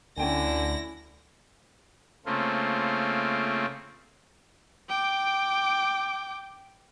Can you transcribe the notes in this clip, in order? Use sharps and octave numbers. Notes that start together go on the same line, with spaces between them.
D2 D3 C#4 E4 G5 G#5 A#6
C#3 A3 A#3 C4 F4
G5 D6